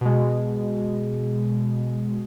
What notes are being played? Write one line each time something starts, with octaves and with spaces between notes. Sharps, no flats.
B2 G#3